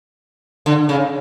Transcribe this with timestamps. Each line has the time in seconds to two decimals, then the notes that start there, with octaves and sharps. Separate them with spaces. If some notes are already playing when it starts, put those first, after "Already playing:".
0.66 D3
0.89 C#3